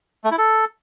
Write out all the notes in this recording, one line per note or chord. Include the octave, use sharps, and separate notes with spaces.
A3
E4
A4